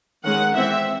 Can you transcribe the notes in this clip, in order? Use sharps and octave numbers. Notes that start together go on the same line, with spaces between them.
D#3 G#3 C#4 F#5
E3 C4 E5